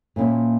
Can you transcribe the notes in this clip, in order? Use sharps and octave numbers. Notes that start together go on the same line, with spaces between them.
A#2 F3 A#3 C#4 E4